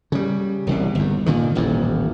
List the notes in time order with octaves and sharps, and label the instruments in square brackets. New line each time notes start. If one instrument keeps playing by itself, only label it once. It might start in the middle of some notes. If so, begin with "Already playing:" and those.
[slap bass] C#3 G3
E1 C2 B2
G1 D#2
A#2 D3 D#3
D#1 A1 F2